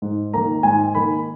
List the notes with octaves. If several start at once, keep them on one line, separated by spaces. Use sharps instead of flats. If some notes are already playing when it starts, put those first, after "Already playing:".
G#2
D#3 A#3 A#5
G#2 G#5
D#3 A#3 B5